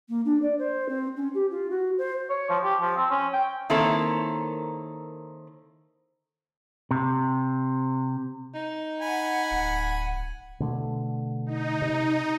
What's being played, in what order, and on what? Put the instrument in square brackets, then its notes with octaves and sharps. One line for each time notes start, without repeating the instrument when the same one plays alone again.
[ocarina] A#3
D4
D5
C5
C4
C#4
G4
F4
F#4
C5
[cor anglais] C#5
F3
G4
F3
C4
C#4
G5
[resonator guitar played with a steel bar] D#3 A#3 C4 E4 A4 C#5
[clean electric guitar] C3
[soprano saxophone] D#4
[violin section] F#5 [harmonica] G#5 B5
[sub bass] D1
[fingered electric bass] B2 D3 A3
[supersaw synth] D#4
[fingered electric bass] C3